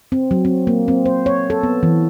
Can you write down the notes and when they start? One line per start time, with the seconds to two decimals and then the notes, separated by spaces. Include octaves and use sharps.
0.12 C4
0.31 F#3
0.45 C4
0.67 A#3
0.88 C4
1.05 C5
1.26 C#5
1.50 A4
1.63 B3
1.83 E3